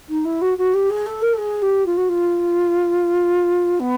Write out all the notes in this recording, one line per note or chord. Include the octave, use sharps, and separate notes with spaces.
D#4
E4
F#4
F#4
G4
G#4
A4
A#4
A4
G#4
G4
F4
F#4
F4
B3